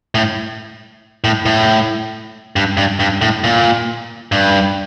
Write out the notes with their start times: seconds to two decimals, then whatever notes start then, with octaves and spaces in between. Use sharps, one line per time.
0.15 A2
1.24 A2
1.46 A2
2.56 G2
2.77 G2
3.00 G2
3.21 A2
3.44 A#2
4.32 G2